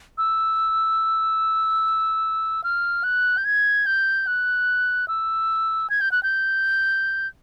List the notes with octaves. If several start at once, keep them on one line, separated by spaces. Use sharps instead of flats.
E6
F6
F#6
G6
G#6
G6
F#6
E6
G#6
G6
F#6
G6